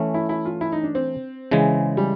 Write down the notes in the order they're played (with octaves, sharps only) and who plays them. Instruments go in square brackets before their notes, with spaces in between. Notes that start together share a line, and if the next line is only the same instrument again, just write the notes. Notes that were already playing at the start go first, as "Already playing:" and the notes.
Already playing: [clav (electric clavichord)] E3 A3 C#4
[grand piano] E4
E4
F4
E4
D#4
D4
C4
[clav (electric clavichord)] C#3 E3 G#3
[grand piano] G3